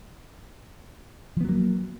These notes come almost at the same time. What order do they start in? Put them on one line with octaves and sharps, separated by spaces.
F3 B3 F#3 A#3